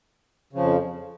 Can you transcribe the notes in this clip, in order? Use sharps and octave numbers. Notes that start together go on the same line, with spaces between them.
F2 C#3 F3